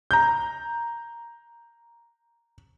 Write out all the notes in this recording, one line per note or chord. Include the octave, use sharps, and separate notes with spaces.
A#5 G6